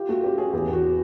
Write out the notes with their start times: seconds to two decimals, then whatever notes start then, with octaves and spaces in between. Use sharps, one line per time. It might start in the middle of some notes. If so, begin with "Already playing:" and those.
Already playing: F4 G4
0.09 A3 F#4
0.23 C#4 G4
0.38 C#4 G#4
0.53 E2 G4
0.68 E2
0.73 F#4